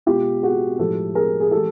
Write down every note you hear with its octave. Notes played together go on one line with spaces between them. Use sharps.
B2 G#3 F4 G4
F#4 G#4
A2 F3 G#3 G4 A4
G#4 A#4
G#4
E3 G#3 G4 A4